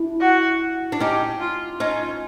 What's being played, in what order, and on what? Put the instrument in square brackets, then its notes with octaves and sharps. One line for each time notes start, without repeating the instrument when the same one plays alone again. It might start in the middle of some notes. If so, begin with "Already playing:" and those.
Already playing: [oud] D4 E4
[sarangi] F#4
[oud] D4
[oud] C#4 D#4 [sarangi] G4
[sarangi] F4
[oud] C#4 D#4 [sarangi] F4